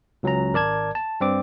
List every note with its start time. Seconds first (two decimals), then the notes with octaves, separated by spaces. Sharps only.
0.23 C#2 F#3 C#4 A#5
0.53 G#1 A#4 D5 A5 G#6
0.95 A5
1.21 G2 C4 D5 D6